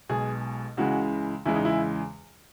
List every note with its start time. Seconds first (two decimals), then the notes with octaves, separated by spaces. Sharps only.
0.09 B1 B2 G#3 G#4
0.77 C#2 C#3 E3 G#3 F#4
1.45 E2 C#3 E3 G#3 E4
1.55 D#4
1.65 E4